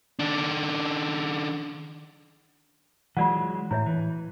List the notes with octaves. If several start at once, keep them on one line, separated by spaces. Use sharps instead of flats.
D#3 D4
E3 F#3 G#3 F4 D5 F#5
A2 E4 C#5 E5
E3